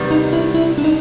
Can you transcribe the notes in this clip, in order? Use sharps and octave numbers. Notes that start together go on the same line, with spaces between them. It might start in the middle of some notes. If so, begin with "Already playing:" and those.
Already playing: C3 D#3 G3 B3
D#4
E4
E4
D4
D#4